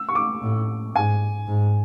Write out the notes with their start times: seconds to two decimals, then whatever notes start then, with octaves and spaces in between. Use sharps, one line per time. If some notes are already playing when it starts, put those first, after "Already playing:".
Already playing: E6
0.09 C#6
0.15 D6
0.42 A2
0.95 G#2 G#5
1.48 G#2